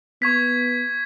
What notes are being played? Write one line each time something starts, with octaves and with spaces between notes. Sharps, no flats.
B3 C#6 G#6 B6